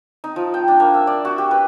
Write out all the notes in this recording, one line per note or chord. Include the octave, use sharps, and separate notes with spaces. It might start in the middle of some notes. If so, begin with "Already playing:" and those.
D#4
F3
G5
D4
A#3
E5
D5
F#4
G4
B4